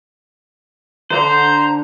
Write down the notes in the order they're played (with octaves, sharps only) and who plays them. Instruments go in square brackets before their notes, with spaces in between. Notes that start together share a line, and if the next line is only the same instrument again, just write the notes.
[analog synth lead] D3 [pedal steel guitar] C5 [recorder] A#5